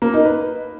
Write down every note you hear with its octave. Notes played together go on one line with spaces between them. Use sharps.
A#3
D#4
B4